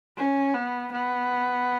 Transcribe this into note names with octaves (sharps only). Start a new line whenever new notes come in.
C#4
B3
B3